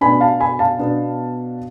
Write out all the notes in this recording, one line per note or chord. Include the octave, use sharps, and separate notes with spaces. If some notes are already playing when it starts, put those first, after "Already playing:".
B2 B3 D4 G#5 B5
F5 A5
G#5 B5
F5 A5
B2 B3 D4